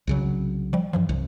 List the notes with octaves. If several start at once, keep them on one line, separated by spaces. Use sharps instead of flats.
C2 C#3 F#3
F3 G3
G2 E3 F3
C2